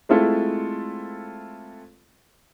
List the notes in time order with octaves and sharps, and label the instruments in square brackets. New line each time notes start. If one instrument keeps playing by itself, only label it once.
[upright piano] G#3 A3 C4 E4 F4 A4